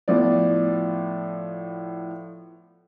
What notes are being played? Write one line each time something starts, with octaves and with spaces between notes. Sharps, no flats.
A2 F3 B3 D5